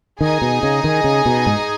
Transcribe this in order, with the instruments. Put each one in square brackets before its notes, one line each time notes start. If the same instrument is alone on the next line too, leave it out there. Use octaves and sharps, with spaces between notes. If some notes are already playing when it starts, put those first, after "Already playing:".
[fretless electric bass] D#3 [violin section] D#4 G#4 D#5 G#5
[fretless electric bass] B2
C#3
D#3
C#3
B2
G#2